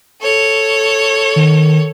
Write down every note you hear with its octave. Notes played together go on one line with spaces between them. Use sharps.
A4 C#5
D#3